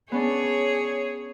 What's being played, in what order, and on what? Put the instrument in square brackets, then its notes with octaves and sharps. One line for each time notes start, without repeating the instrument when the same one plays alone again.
[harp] B3 C#4 D4 [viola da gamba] G#4 C#5